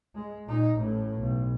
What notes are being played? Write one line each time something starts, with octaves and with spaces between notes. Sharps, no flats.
G#3
A#2 D#4
A1 A2
B1